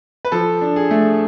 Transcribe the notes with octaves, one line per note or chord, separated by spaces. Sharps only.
B4
F3 A4
D4
G#4
A3